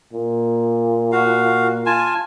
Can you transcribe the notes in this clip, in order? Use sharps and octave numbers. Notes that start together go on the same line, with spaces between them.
A#2
F#4 F5
F4 G#5 A5